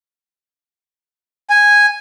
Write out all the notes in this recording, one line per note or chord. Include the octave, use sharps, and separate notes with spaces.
G#5